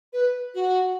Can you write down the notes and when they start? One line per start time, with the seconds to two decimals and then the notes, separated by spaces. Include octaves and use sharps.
0.13 B4
0.55 F#4